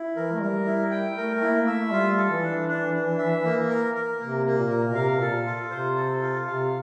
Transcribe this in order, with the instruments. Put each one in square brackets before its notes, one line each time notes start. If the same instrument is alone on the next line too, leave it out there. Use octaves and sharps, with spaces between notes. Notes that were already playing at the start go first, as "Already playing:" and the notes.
Already playing: [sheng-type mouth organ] E4
[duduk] E3 [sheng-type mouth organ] A#4
[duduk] A3
[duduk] G3 [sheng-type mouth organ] A#4
[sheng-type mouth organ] E4
G5
[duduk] A3 [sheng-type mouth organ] A#4
[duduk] A#3 [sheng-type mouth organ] E4
[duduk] A3 [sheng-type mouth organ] E5
[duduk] G3 [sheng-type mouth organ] F4
[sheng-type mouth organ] A4
[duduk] E3
[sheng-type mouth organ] D4
D4
D4
E5
A#3
A#4
A#4
[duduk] C3 [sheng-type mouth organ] A#3
[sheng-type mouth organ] A#3
[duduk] A#2
[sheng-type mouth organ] A#4
[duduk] A#2
[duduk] C3 [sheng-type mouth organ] F5
[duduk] A#2 [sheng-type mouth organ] A4
[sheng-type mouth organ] F4
[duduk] C3 [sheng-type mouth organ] C5
[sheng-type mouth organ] A4
F4
[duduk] C3 [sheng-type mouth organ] F5